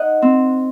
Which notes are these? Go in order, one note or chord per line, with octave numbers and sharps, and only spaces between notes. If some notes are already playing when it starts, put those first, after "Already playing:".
Already playing: D#4 D#5 F#5
C4